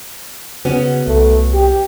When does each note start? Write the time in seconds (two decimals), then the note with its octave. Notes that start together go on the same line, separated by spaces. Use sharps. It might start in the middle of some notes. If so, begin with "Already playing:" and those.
0.65 C#3 B3 C#4 F#4
1.07 C2 A3
1.53 G4